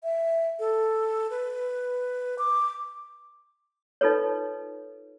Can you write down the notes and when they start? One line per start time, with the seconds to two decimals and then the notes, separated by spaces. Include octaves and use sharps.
0.03 E5
0.59 A4
1.30 B4
2.39 D6
4.01 D#4 F4 A4 B4 C#5